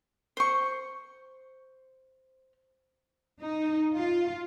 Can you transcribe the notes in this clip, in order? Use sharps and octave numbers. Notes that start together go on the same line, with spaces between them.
C5 C#6
D#4
F4